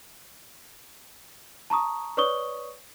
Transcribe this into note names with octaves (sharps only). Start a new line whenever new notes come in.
A5 A#5 C#6 D#6
B4 C#5 D5 C#6 D#6 G7